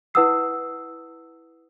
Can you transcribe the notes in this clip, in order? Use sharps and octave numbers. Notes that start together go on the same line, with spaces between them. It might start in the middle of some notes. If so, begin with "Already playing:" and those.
E4 B4 F#5 D#6 E6 C7